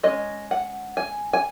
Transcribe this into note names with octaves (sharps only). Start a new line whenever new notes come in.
G#3 C#4 D#5
F#5
G#5
G#5